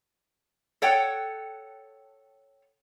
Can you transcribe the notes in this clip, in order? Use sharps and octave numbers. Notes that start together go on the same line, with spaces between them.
A4 C#5 F#5 G5